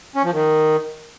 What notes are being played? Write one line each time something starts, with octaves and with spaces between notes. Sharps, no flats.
C#4
F3
D#3